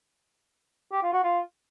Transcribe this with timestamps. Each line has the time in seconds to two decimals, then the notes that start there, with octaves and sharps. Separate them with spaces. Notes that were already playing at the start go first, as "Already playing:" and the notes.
0.92 G4
1.02 F4
1.13 F#4
1.23 F4